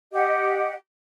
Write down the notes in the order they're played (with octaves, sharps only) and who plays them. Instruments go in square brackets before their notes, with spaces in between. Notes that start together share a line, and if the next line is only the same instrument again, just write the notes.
[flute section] G4 D#5 F#5